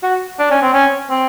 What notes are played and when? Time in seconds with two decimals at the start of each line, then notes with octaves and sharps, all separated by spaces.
0.03 F#4
0.39 D4
0.51 C#4
0.62 C4
0.74 C#4
1.10 C4